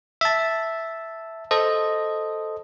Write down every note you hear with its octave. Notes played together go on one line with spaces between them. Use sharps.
E5 A5
A4 C5 D#5